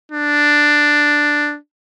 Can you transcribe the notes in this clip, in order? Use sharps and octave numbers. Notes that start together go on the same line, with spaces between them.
D4